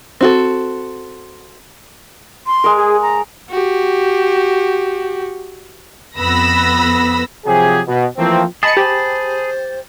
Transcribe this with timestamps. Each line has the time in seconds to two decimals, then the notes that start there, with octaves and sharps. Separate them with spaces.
0.21 C4 F#4 A4
2.47 C6
2.64 G#3 A#4
2.77 G#4
3.02 A#5
3.50 F#4 G4
6.19 F2 B3 B5 E6 A#6
7.46 C3 F3 F#3 G4 G#4
7.88 B2
8.18 E3 F3 A3 A#3 C4
8.63 G#4 D#5 A5 B5 A6 C#7
8.77 G4 C5